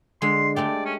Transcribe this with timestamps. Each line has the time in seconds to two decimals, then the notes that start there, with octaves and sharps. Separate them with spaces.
0.22 D3 G#3 C6
0.56 G#3 A3 G4 D5
0.85 C#4